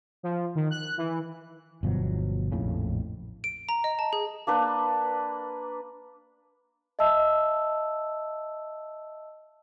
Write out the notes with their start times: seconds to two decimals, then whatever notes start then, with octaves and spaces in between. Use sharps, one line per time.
0.23 F3
0.55 D#3
0.71 F#6
0.98 E3
1.83 G1 B2 F3 F#3
2.52 A#1 F2 A2 C#3
3.44 D7
3.69 A#5
3.84 D#5
3.99 A5
4.13 G#4
4.47 A#3 D4 B4
6.99 D#5 E5 A5 E6